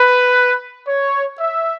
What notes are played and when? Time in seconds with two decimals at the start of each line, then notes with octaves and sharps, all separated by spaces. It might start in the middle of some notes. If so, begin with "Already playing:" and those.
Already playing: B4
0.87 C#5
1.39 E5